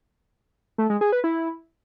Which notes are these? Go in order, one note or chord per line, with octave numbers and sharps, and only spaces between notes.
A3
G#3
G#4
B4
E4